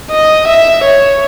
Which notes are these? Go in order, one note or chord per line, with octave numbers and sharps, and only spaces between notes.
D#5
E5
C#5